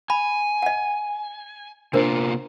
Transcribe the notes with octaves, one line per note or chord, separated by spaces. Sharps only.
G#5 B5
D#5 F#5
C3 A#3 D4 F4 A#4 C5